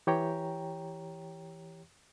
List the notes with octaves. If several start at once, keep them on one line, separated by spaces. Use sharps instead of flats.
E3 G4 C#5 G5 A#5